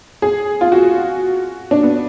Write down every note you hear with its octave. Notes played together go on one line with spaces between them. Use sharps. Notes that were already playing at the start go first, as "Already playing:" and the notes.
G#4
F4
F#4
D4
B3